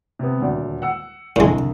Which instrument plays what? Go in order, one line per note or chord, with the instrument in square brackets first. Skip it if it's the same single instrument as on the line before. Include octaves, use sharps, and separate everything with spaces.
[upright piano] C3 B3
D#1 D2 D5
F#5 E6
[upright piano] C2 D3 [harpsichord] A2 G#3